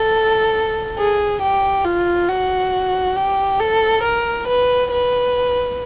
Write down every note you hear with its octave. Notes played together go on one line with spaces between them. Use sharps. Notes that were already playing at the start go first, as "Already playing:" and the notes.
Already playing: A4
G#4
G4
F4
F#4
G4
A4
A#4
B4
B4